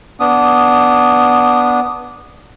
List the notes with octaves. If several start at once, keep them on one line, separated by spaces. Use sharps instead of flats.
B3 D4 D#6